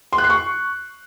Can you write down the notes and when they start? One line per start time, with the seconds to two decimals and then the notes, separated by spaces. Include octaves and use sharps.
0.13 C6
0.18 F#6
0.24 C7
0.30 C#6